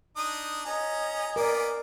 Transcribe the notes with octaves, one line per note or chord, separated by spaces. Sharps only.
D4 D#4 D#6
C#4 D#5 G#5 A#5
A#3 B3 A#4 D5 D6